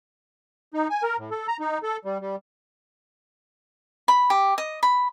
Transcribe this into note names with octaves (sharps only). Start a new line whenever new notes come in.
D#4
G#5
A#4
A2
A4
A#5
D#4
A4
G3
G3
B5
G4
D#5
B5